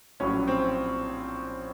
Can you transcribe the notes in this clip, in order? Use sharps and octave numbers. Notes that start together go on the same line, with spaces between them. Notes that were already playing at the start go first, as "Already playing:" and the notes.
A#1 A2 F#3 C#4
C4